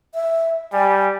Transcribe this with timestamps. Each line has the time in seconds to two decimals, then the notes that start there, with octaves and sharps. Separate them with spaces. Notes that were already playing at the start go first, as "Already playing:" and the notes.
0.14 E5
0.73 G3 G#5